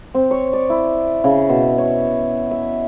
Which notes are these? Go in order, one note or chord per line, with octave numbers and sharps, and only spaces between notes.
C4
C#5
D5
E4
C#3
B2
C#5
E5